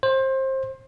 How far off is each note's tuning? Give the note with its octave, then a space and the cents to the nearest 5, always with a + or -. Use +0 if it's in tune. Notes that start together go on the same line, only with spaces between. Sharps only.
C5 +25